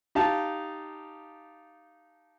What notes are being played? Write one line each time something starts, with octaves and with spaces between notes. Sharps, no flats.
D#4 G4 F5 A5